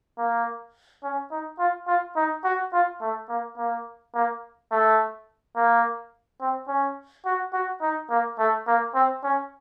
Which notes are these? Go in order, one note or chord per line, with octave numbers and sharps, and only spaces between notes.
A#3
C#4
D#4
F4
F4
D#4
F#4
F4
A3
A#3
A#3
A#3
A3
A#3
C4
C#4
F#4
F#4
D#4
A#3
A3
A#3
C4
C#4